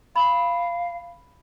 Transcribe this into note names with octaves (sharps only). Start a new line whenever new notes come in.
F5 B5